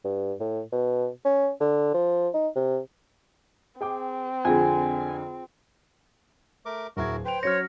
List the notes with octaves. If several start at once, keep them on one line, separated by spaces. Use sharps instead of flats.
G2
A2
B2
C#4
D3
F3
D#4
C3
C4 G#4 G5 D6
F2 D3 F4 G#4 G#5
A3 A#4 D6
D1 E4 F#4 G#4 A#4 G#6
B4 C5 G5 F7
F#3 C#4 C#5 F6 A#6 C#7